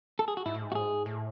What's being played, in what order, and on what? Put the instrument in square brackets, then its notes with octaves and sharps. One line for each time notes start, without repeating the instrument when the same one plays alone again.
[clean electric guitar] A4
G#4
F#4
[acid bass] G#2 [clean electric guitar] E4
[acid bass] A2
G#2
[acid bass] A2 [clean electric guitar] F#4
[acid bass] G#2 [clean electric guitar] G#4
[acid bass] A2